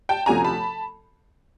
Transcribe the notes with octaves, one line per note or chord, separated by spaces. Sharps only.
G5 A5
D2 C3 F3 A3 C#4 G#5 A#5
A5 B5